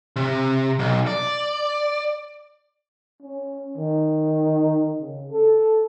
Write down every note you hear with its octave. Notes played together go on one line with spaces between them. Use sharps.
C3
B1
D5
C#4
D#3
C#3
A4